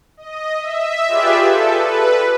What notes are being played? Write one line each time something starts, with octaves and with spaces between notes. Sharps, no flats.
D#5
E5
F4 G4 G#4 B4 D5 E5
A4
B4